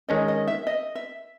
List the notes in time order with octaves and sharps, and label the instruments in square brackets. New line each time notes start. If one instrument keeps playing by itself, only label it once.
[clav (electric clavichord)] D#3 G#3 C#4 [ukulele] D#5
[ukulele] D#5
E5
D#5
E5